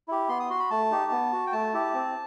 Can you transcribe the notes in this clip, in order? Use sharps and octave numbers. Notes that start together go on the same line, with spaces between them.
E4 G4
B3 C6
D#6
F#4 C6
B5
A3 A5
D#4 G4
B3
F#4
G5
A3 A5
E4 G4
C4